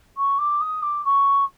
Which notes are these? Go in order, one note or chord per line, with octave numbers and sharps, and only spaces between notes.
C#6
D6
D#6
D6
C#6